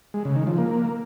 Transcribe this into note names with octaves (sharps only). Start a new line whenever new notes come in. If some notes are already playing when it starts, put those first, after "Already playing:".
G#3
C#3
D#3
F3
A#3